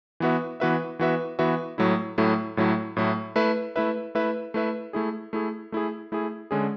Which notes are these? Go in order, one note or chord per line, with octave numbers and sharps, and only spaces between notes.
E3 B3 F#4 B4 E5
E3 B3 F#4 B4 E5
E3 B3 F#4 B4 E5
E3 B3 F#4 B4 E5
A2 F#3 A3 E4
A2 F#3 A3 E4
A2 F#3 A3 E4
A2 F#3 A3 E4
A3 E4 B4 E5
A3 E4 B4 E5
A3 E4 B4 E5
A3 E4 B4 E5
A3 E4 G#4
A3 E4 G#4
A3 E4 G#4
A3 E4 G#4
D3 G#3 C#4 G#4